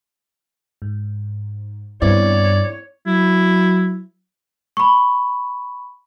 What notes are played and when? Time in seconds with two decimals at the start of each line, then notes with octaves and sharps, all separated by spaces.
0.82 G#2
2.02 G2 B3 C4 E4 C#5 D5
3.07 F#3 E4
4.77 B5 C#6